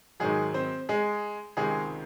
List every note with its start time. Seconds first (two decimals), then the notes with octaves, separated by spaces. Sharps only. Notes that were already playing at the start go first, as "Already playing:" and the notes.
0.20 G#2 D#3 F#3 G#3 G#4
0.54 C4 C5
0.89 G#3 G#4
1.57 C#2 C3 D#3 G#3 G#4